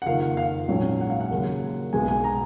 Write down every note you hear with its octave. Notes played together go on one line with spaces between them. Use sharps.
F#5
F#1 F2 D#3 F5
F#5
F5
A#1 G#2 F#3 C#4
F#5
F5
F#5
D#2 C#3 F#3
B1 B2 G#3 B3 G#5
G#5
A#5